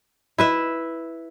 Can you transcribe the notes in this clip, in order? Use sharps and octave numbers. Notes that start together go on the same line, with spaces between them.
E4 B4 E5